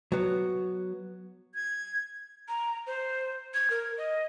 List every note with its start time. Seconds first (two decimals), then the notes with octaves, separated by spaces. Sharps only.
0.12 F#3 B3
1.55 G#6
2.48 A#5
2.87 C5
3.54 G#6
3.70 A#4
3.98 D#5